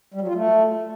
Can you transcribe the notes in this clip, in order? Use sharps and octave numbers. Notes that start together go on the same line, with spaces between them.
G3
F#3
F4
A3